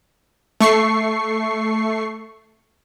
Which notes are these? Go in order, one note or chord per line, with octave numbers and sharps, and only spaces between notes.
A3 C#6 C7